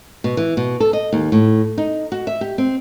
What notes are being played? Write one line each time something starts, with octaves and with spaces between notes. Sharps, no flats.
B2
E3
B2
A4
D#5
D#2
A2
D#4
F#4
E5
G4
C4